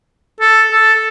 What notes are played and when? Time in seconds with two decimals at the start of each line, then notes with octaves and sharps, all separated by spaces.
0.40 A4
0.72 A4